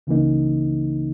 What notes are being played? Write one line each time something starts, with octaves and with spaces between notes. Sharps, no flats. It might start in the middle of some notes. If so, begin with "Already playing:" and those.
C#2 C#3 E3 A#3 D#4